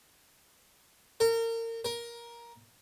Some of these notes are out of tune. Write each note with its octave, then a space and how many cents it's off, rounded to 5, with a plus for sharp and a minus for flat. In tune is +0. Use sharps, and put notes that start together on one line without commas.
A#4 -30
A#4 +15